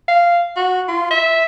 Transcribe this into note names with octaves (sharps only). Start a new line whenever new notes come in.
F5
F#4
F4
E5